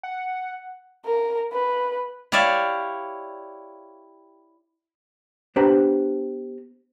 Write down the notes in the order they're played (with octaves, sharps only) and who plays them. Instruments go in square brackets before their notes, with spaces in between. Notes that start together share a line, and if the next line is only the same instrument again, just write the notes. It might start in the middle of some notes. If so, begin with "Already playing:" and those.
[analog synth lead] F#5
[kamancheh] A#4
B4
[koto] E4 G4 C#5 D5 E5 F5
[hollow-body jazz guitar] B3 D4 G4 B4 C5 A#5